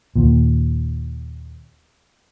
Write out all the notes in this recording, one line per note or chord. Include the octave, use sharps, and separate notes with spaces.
D#2 A#2